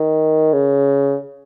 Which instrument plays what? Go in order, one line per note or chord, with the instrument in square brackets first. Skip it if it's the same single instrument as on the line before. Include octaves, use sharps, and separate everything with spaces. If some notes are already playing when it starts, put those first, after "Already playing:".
Already playing: [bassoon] D#3
C#3